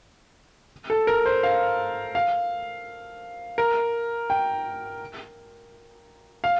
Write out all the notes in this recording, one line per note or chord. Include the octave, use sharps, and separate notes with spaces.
A4
A#4
C5
F5
F5
A#4
G5
F5